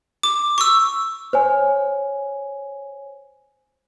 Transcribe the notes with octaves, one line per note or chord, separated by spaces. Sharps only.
D6
C#6 E6
C5 C#5 G#5